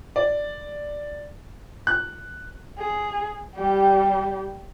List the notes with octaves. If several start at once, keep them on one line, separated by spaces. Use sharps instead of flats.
D5
F#6
G#4
G3 G4